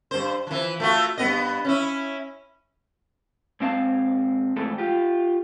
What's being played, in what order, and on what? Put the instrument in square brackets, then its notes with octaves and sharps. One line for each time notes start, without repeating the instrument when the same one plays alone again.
[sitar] G2 C5
E3 F3
A3 F4 F#4
G2 B3 D#5
C#4 E4
[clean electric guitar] G#2 C4 F5 A5
G#2 E3 F3 A3 A4
F4 G4